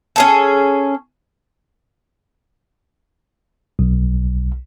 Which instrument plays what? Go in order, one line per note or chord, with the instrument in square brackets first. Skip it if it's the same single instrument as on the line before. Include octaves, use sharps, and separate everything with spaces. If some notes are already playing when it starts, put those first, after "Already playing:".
[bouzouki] C#4 G#4 A4
[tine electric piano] B1